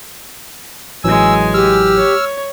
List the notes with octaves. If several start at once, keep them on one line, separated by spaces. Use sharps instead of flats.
A1 E3 F#3 G#3 G#5 E6
G4 E6 F6
C#5